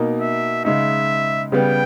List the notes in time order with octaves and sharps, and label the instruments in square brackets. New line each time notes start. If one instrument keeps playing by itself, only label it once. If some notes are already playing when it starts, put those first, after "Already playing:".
Already playing: [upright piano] B2 A#3 D#4 A#4
[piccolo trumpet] E5
[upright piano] C#3 G#3 D#4 [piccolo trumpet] E5
[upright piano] C#3 G3 B3 [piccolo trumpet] G5